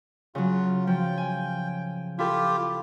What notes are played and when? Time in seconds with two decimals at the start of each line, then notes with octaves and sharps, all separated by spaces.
0.35 C#3 F#3 F4
0.87 F3 G5
1.17 G#5
2.19 E4 F4 G4 A4